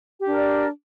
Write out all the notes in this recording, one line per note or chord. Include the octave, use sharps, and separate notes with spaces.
D4 G4 A#4 D5